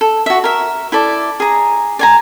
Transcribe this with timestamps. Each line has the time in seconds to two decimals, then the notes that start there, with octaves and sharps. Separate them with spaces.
0.01 A4
0.26 F#4 E5
0.44 A#4 E5
0.92 E4 A4 D5
1.40 G#4 A#5
1.99 D5 G#5 A#5